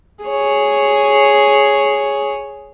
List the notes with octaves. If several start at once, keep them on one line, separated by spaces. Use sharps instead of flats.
G#4 C#5